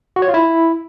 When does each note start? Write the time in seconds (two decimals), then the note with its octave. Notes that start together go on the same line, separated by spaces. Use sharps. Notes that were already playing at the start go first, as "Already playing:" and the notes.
0.16 F#4
0.22 C#5
0.28 F4
0.34 E4